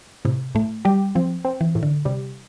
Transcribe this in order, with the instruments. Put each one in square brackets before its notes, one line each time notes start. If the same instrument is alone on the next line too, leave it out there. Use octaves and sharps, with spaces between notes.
[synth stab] A2 [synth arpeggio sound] C3
[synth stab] A2 [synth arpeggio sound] A3
[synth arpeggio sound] G3 [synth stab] G4
[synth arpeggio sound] F3 [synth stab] C4
[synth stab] C4
[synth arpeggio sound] E3
[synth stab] A2
[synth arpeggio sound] D3
[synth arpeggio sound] C3 [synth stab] G3